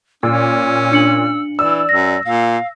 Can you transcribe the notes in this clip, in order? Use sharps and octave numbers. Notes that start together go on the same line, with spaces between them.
A#2 C#4 E6
D4 C#7 F#7
E3 D5 E6
F#2 A#6
A#2 F5